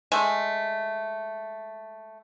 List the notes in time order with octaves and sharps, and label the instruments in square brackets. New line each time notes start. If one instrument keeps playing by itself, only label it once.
[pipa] G#3 A3